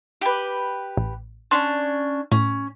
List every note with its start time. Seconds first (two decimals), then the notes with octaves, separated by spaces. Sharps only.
0.21 G4 B4
0.97 A1
1.51 C#4 D4 A5 C6
2.32 A2 C#4